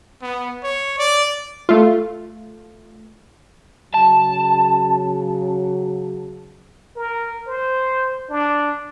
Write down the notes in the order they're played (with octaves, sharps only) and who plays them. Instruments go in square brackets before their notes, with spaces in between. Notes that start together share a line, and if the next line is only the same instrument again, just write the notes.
[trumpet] B3
C#5
D5
[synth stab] A3 F4
[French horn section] C#3 F#3 [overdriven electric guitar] A5
[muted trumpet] A#4
C5
D4